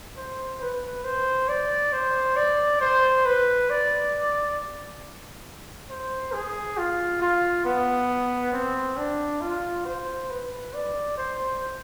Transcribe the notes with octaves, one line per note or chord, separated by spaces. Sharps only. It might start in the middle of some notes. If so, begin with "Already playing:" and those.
C5
B4
C5
D5
C5
D5
C5
B4
D5
C5
G#4
F4
F4
B3
C4
D4
F4
C5
B4
D5
C5